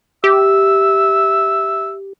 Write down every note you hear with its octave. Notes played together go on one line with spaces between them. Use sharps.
G4 E5